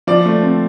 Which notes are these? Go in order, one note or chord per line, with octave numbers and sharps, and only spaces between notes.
F3 D5
A3
C4